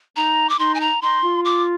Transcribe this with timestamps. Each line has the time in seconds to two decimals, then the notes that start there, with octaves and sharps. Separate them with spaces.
0.16 D#4 A#5
0.49 D6
0.59 D#4 C6
0.75 G#5
0.81 A#5
1.02 D#4 C6
1.23 F4
1.45 D6